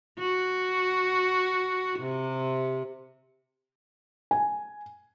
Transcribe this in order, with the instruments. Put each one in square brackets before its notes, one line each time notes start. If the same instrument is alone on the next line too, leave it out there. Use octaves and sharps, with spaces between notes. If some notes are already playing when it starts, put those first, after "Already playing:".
[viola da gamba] F#4
C3
[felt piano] G#5